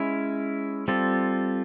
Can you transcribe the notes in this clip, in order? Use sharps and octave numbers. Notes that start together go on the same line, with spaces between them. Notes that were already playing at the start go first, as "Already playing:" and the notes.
Already playing: G#3 C#4 E4
G3 C4 F4 A4